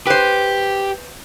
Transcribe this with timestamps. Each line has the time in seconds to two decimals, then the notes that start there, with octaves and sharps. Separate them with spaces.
0.07 G4 B4 C5